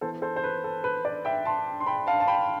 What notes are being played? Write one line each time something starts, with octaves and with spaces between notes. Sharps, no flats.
E3 B3 A4 C5
A4 C5
C5
B4
A4
B4
B4 D5
E5 G5
A5 C6
C6
G5 B5
F5 A5
A5
G5 B5